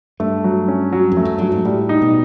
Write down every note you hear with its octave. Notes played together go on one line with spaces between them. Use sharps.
G2 A3
F#3
C#4
F#3
F2
A3
F#2
G2 F#3
G#2
A2 G3
D#4
B2